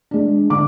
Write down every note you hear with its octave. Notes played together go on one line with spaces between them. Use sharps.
G#3 D4
D3 D6